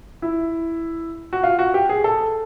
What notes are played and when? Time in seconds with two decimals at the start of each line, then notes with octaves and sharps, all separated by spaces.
0.22 E4
1.33 F#4
1.43 F4
1.59 F#4
1.74 G4
1.89 G#4
2.04 A4